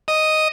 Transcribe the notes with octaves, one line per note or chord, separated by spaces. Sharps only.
D#5